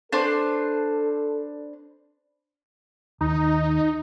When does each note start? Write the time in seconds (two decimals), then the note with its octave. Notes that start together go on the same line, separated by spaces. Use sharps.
0.12 D4 A4 B4 C5
3.21 D#2 D#4